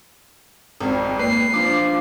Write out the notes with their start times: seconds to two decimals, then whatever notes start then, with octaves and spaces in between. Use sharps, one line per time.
0.81 G#1 F2
1.19 A#3 B4 C7
1.54 F3 D4 D6